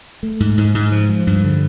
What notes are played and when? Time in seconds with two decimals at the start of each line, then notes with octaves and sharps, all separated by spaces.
0.23 A3
0.40 G#2
0.58 G#2
0.75 G#2
0.92 F3
1.09 F3
1.27 G2
1.44 D3